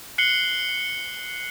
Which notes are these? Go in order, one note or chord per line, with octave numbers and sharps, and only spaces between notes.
F#6 C7 C#7 F#7 G7